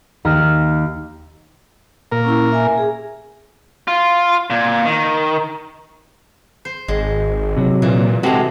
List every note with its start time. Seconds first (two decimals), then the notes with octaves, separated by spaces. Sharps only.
0.25 D#2 A#5 F6
2.12 A#2 A#4
2.25 C#4 E4
2.52 E5 G#5
2.78 G#4
3.88 F4
4.50 A#2
4.85 D#3
6.65 C5
6.88 G#1 G#3
7.57 C3 F#3
7.82 A#2 E3
8.23 C3 G#3 F#4 G4 A4 A#5